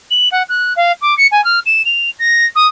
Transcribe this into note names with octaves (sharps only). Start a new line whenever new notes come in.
F#7
F#5
F#6
F5
D6
C#7
G#5
F6
E7
F7
A#6
D#6